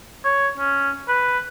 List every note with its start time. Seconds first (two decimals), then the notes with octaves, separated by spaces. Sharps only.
0.24 C#5
0.58 C#4
1.08 B4